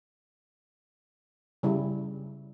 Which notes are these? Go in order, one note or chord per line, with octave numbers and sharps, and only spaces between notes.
C#3 G3 E4